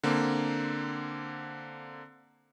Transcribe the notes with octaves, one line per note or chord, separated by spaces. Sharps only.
D3 A#3 C4